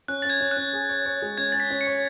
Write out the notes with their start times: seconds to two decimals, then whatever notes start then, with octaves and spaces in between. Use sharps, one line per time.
0.08 C#4 F#6
0.22 A6
0.25 C#4 G#6
0.41 C#4
0.51 F#6
0.57 C#4
0.73 G#4
0.89 C#5
1.06 C#5
1.22 G#3
1.38 C#4 G#6
1.52 C#4 A6
1.60 B6
1.70 C#4
1.81 C#7
1.87 C#5